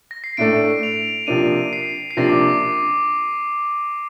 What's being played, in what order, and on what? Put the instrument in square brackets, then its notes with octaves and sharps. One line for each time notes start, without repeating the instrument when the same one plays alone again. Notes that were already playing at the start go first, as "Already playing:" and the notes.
[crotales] A#6
C7
[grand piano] A2 A3 D4 A4 [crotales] D7
[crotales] F7
[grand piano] C3 F3 A#3 D4 [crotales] D#7
[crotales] C7
C7
[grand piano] C3 F3 A#3 D4 [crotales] A#6
[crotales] D6